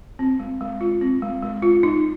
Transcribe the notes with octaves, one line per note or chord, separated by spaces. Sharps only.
C4
G#3
G#3
F4
C4
G#3
G#3
F4
D#4